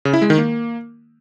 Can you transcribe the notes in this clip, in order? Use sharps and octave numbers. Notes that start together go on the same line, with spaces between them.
C#3
E4
G#3
D#3
A#3